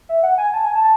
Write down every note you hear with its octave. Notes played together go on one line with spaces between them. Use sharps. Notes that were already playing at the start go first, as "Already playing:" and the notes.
E5
F#5
G#5
A5
G#5
A5